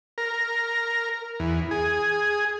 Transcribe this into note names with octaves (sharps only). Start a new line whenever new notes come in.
A#4
E2
G#4